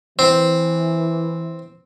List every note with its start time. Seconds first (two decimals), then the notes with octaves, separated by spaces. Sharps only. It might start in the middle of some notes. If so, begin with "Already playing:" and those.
0.19 E3 C4